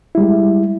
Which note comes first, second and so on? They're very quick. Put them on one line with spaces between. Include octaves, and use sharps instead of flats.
E4 G3 G#3